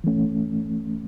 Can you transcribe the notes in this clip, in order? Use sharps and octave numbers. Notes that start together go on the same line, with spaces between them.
E3 A3 C#4